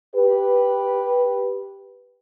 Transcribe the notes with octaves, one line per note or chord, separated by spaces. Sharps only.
G4 B4